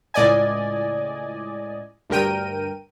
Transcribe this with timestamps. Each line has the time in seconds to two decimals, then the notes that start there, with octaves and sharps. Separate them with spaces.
0.14 C#2 A2 D5 D#5 G#5
2.10 D2 G2 A#4 G5 D#7